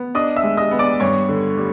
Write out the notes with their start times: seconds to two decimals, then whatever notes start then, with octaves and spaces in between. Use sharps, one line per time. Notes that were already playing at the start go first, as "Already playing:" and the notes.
Already playing: B3
0.15 D4 D#5 D#6
0.36 E5 E6
0.43 G#3
0.57 D#5 D#6
0.71 B3
0.79 D5 D6
1.00 G2 C#5 C#6
1.29 D3
1.58 G3